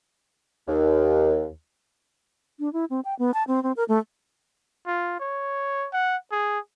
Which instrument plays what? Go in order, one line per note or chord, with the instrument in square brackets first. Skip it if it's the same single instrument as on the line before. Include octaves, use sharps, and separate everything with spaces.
[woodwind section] D#2
[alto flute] D4
E4
C4
G5
B3
A5
C4
C4
A#4
A3
[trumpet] F4
C#5
F#5
G#4